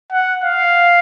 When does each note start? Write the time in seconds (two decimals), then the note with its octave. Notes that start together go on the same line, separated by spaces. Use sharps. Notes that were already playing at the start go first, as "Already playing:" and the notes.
0.12 F#5
0.44 F5